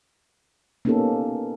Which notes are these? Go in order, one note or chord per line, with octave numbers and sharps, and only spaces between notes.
A#3 B3 C#4 D#4 G4 A4